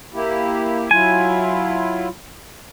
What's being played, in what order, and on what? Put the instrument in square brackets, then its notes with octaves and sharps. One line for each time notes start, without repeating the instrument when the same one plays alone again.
[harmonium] A#3 E4 G4
[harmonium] F#3 E4 F4 [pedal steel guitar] G#5